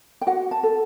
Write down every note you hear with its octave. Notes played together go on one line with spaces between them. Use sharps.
G5
F#4 F#5
A5
A4